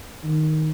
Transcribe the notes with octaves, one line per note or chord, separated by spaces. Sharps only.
D#3